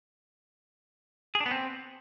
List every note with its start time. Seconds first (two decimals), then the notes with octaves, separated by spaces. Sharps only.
1.35 G#4
1.40 D4
1.46 B3
1.51 C4